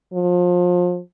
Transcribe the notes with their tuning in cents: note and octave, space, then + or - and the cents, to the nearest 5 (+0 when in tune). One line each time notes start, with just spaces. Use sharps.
F3 +30